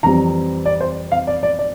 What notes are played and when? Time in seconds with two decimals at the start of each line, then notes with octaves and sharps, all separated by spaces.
0.03 F2 E3 G3 C4 A#5
0.65 D5
0.81 C5
1.12 F5
1.27 D5
1.43 D5
1.59 D5